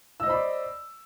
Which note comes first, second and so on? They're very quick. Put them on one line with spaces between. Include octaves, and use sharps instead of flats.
E6 D#5 C5 B5 D5